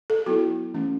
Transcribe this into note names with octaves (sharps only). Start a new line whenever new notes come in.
A4
F#3 B3 E4 F#4
E3 A3 C#4